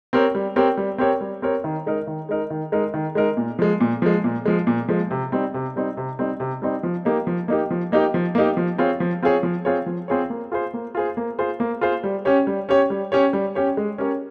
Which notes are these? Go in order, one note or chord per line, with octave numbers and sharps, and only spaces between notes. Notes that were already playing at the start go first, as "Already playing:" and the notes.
C4 G4 A#4 C#5
G3
C4 G4 A#4 C#5
G3
C4 G4 A#4 C#5
G3
C4 G4 A#4 C#5
D#3
G#3 D#4 A#4
D#3
G#3 D#4 A#4
D#3
G#3 D#4 A#4
D#3
G#3 D#4 A#4
A#2
F3 G#3
A#2
F3 G#3
A#2
F3 G#3
A#2
F3 G#3
C3
G3 C4 D#4
C3
G3 C4 D#4
C3
G3 C4 D#4
C3
G3 C4 D#4
F3
A#3 D#4 G4
F3
A#3 D#4 G4
F3
A#3 D#4 G4
F3
A#3 D#4 G4
F3
C4 F4 G#4 C#5
F3
C4 F4 G#4 C#5
F3
C4 F4 G#4 C#5
F3
C4 F4 G#4 C#5
A#3
F4 G#4 C5
A#3
F4 G#4 C5
A#3
F4 G#4 C5
A#3
F4 G#4 C5
G3
C#4 G4 C#5
G3
C#4 G4 C#5
G3
C#4 G4 C#5
G3
C#4 G4 C#5
G#3
C#4 G4 A#4 C#5